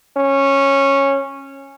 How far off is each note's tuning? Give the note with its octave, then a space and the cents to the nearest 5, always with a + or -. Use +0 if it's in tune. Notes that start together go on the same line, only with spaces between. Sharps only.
C#4 -10